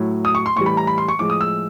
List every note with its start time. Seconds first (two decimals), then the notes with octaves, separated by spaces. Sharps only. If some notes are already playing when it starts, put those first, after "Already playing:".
Already playing: A2 F#3
0.25 D#6
0.35 C#6
0.46 C6
0.56 A2 E3 G3 C#6
0.66 B5
0.77 A#5
0.87 B5
0.98 C6
1.08 C#6
1.19 A2 F3 G#3 D6
1.30 D#6
1.41 E6